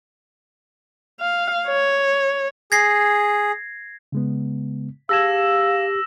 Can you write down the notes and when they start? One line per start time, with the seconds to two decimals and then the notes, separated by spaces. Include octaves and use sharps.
1.20 F5
1.67 C#5
2.72 G#4 G#6 A#6 C7
4.12 C#3 G#3 B3
5.09 G4 G#4 F5 A5 E6 G#6 A#6 E7